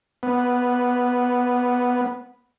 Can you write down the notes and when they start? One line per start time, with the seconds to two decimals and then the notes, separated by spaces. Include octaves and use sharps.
0.23 B3